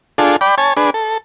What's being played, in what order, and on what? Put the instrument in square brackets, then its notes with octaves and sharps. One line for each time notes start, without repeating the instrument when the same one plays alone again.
[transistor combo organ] D4 F4 G#4 A4
D5 G5 B5
C#5 G#5 A5
D4 G#4 B4
A4